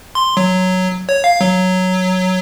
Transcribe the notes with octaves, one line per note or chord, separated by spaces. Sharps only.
C6
F#3
C#5
F5
F#3